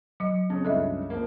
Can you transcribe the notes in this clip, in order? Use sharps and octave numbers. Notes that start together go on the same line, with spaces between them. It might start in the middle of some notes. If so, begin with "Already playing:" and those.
F#3 D#5 C#7
C#3 C4
C#2 G2 C#3 A4 D#5 E5
F3 A#3